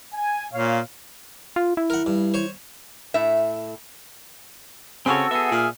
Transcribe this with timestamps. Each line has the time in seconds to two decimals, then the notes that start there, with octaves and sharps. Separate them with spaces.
0.13 G#5
0.53 A#2 C#5 F5
1.56 F4
1.77 E4
1.90 A#4 F#5
2.06 G2
2.34 C5 C#5
3.14 A2 E5
5.06 C#3 C4 C#4 F#4 A4 C#5 E6
5.31 B3 G#4 E5
5.52 A#2 F6